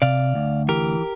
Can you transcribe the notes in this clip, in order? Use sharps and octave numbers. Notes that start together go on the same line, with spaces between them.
C3 D5 F5
D2
E3 G4 A#4